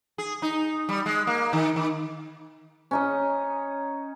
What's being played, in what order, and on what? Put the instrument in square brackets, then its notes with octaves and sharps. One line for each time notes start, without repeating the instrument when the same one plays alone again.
[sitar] G#4
D#4
G3
G#3
A#3
D#3
D#3
[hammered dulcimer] C#4 D#4 D#5